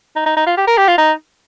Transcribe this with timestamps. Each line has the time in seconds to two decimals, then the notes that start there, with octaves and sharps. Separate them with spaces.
0.16 D#4
0.26 D#4
0.37 D#4
0.47 F4
0.57 G4
0.67 A#4
0.77 G4
0.88 F4
0.98 D#4